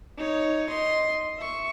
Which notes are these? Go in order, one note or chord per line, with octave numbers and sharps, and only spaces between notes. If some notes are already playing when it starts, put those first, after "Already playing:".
D#4 C#5
D#5 C6
E5 C#6